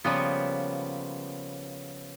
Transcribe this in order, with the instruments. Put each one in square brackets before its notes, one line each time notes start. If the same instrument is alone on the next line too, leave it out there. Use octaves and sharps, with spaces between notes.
[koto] C#3 F3 G3 A#3 B3